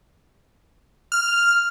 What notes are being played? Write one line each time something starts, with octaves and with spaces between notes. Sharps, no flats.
F6